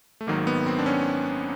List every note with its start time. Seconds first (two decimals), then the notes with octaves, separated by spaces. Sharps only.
0.21 A3
0.27 G#1 G#2 D#3 F#3 A#3
0.47 B3
0.66 C4
0.78 D4
0.86 C#4